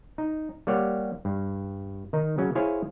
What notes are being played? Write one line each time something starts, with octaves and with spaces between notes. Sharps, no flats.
D#4
G3 A#3 G4 C#5 F#5
G2
D#3 D#4
C#3 F#3 C#4
E4 G#4 C5 C#5 F5 G#5